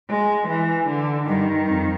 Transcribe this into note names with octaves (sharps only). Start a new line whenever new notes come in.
G#3
E3
D3
G2 D#3
F2